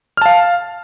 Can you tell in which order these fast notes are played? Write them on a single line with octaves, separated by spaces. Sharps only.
F6 A5 F5